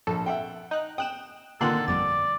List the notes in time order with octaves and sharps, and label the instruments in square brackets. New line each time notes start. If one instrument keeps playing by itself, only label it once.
[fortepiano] A#1 [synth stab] A4
[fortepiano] E5 F#5 G5
[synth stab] D#4 F#6
[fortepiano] G5 [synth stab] D#6 F#6 E7
[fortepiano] A#2 D3 D#3 [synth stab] A#3 C6 F#6 [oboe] A4
[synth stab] G1 F2 A6 [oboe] D5